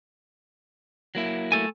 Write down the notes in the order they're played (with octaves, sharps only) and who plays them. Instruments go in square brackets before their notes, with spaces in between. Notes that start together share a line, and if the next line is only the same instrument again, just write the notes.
[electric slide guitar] F#3 A#3 E4
[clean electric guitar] A3 A4 G#5